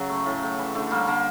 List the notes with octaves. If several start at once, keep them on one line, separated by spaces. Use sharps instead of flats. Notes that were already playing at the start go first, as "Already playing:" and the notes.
Already playing: C#3 F#3
A3
A2
A2
E3
D3 A3
G3 A#3
D3 A#3